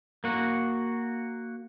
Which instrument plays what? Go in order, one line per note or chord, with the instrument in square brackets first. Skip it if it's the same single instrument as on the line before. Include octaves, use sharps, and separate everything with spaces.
[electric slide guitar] A#3 F#4